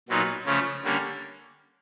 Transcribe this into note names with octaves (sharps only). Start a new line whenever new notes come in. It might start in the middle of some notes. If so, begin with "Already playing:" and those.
A#2 F#3 B3 D#4
C#3 F3 A3 C#4
D3 G3 A#3 C#4